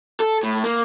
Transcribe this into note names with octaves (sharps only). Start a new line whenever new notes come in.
A4
A2
A#3